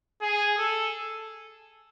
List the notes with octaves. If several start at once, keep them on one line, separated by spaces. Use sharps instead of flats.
G#4
A4